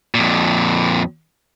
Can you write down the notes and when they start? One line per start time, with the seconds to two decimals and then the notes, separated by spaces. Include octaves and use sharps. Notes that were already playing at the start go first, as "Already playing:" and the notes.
0.15 F2 A#2